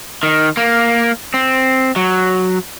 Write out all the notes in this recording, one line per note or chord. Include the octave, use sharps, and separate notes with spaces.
D#3
A#3
C4
F#3